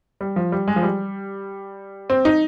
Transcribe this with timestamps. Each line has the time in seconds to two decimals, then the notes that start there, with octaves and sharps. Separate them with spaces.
0.21 G3
0.36 F3
0.52 G3
0.68 G#3
0.76 F3
0.83 G3
2.10 C4
2.25 D#4